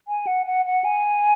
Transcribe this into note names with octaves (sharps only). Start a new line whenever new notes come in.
G#5
F#5
F#5
F#5
G#5